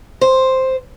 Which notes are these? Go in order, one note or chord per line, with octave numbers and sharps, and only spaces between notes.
C5